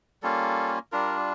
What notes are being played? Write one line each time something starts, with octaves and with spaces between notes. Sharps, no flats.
G3 A#3 C#4 F4 A4
G3 D4 F4 A#4